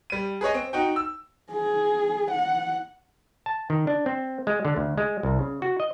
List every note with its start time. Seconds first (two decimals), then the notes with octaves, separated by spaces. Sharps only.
0.10 G3 D#7
0.41 G#4 B4 C#5 D#5
0.54 C4
0.73 D#4 F#4 G5
0.96 E6
1.51 G#4
2.31 F#5
3.46 A5
3.70 D#3
3.87 D4
4.06 C4
4.47 G#3
4.65 D3
4.76 D2
4.98 G#3
5.23 C2
5.39 C#3
5.62 F#4
5.80 D#5